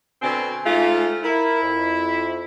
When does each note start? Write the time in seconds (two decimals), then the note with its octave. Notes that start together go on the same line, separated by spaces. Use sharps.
0.22 B2 D3 C4 G#5
0.65 G#2 A3 F4
1.23 E4 A#4
1.62 F2